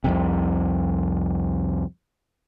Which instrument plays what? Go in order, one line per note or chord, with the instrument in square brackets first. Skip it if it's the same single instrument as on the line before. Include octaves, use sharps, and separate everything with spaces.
[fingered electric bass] C2 F2 C3